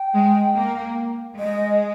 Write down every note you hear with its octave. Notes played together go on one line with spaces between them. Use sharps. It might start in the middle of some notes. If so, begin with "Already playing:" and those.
Already playing: G5
G#3
A#3
G#3 D#5